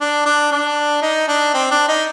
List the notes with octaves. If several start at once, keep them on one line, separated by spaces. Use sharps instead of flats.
D4
D4
D4
D#4
D4
C4
D4
D#4